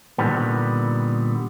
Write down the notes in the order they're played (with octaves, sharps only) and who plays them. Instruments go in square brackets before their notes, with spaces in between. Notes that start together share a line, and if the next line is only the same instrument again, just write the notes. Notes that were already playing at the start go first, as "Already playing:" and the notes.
[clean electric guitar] A#2 D3 D#3 G3 B3